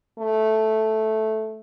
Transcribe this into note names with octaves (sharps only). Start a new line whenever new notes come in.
A3